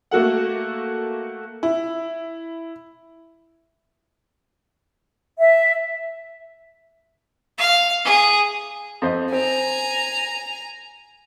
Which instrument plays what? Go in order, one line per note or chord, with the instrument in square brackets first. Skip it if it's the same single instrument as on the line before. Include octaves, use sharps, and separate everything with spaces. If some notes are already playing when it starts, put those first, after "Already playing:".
[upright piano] A3 A#3 F#4 A4 F#5
[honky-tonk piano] E4
[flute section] E5
[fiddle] F5
G#4
[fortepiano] F2 C5 D#5
[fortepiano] C4 [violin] G#5 A#5